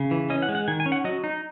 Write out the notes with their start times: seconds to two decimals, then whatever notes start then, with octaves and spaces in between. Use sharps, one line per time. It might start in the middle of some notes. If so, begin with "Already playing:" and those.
Already playing: C#3
0.11 E3
0.30 C#4 D#5
0.42 F#5
0.49 G#3
0.55 F#5
0.68 D#3 G#5
0.80 G#5
0.86 C#4
0.92 F#5
1.04 F#3 D#5
1.24 D#4